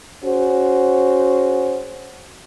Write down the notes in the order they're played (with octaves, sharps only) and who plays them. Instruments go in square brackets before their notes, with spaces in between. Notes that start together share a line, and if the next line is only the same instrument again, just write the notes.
[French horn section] C#4 F#4 G#4 C5